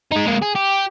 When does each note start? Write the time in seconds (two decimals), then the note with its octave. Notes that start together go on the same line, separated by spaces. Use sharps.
0.12 G#3 D#4
0.27 G#3 A#3
0.42 G#4
0.56 G4